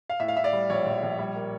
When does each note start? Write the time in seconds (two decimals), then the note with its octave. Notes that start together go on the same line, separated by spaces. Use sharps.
0.10 F5
0.20 A2 E5
0.28 F5
0.36 A2 E5
0.44 D5
0.53 G3
0.70 A#1 C#5
0.86 A#1
1.03 A#1
1.18 G3
1.35 A#3